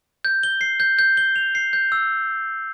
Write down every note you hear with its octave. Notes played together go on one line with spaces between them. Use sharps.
G6
G7
C7
G6
G6
G7
F7
C7
G6
E6